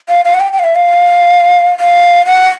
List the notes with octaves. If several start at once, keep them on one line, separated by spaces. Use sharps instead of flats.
F5
F5
F#5
G5
G5
F5
E5
F5
F5
F#5